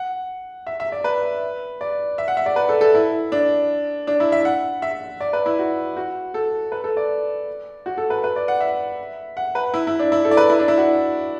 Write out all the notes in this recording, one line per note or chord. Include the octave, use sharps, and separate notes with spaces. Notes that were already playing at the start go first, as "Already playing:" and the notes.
Already playing: F#5
E5
E5
D5
B4
D5
E5
F#5
E5
D5
B4
A4
A4
E4
D4
D4
E4
E5
F#5
E5
D5
B4
E4
F#4
F#4
A4
B4
A4
D5
F#4
A4
B4
B4
D5
F#5
E5
F#5
B4
E4
E4
D4
E4
A4
D5
B4
E4
D4
E4
F#4